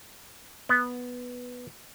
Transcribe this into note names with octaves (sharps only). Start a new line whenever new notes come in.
B3